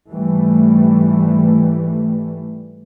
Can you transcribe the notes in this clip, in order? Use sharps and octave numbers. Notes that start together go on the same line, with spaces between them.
G#2 E3 G3 A3